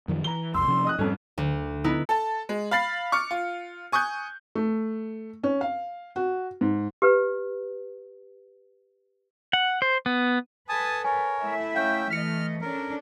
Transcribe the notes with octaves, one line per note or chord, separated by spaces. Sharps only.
F#2 D#3 F3
E3 A#5 G7
C2 F2 C6 E6
C3 F3 C#4
D#5 D#6 F#6
F2 G#2 G3 C4 C#4 A4
D2
B3 D#4 E4
A4 A5
G#3
F5 B5 A6 C7
C#6 D6 F6 C#7
F4
G#5 C#6 D#6 F#6 G6
A3
C#4
F5
F#4
G#2
G4 B4
F#5
C5
B3
A4 B4 G#5 A5 D#6
A#4 C#5 G#5
A3 E4 E5
C#4 F5 G5 G6
E3 A3 D#5 F6 B6 C#7
C#4 D4 A4 A#4